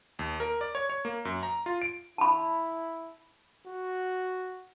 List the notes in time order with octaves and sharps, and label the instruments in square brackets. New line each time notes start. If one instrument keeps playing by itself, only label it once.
[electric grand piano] D#2
A#4
D5
C#5
C#5
A#3
F#2
A#5
F4
D7
[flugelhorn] E4 [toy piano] A5 B5
[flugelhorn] F#4